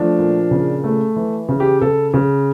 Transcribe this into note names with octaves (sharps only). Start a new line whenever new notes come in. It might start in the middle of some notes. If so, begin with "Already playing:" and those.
Already playing: F3 A3 D4
A#2
C#3
A3
E3
C#3
G4
C#3 A4
C#3